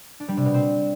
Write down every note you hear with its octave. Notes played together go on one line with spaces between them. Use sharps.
D4
G3
C3
B2
C4